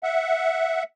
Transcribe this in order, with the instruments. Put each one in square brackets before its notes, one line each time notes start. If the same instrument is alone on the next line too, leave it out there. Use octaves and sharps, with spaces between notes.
[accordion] E5 F#5